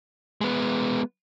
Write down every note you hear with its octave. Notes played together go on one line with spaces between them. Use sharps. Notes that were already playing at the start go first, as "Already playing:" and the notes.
G#3 B3